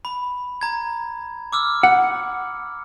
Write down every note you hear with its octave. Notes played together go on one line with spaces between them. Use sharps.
B5
A#5 G#6
D6 E6 F6
F#5